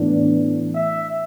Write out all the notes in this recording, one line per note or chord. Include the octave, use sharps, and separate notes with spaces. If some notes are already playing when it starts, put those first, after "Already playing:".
Already playing: A2 E3 B3 D4
E5